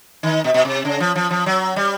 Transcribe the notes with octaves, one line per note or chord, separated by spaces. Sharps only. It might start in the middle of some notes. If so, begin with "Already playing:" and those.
D#3
B2
B2
C3
C#3
F3
F3
F3
F#3
G3